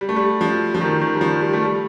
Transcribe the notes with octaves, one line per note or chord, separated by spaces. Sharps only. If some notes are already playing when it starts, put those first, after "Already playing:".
G3
A3
G3
F3
F3
D#3
D#3
G3
F3
G3
A3
G3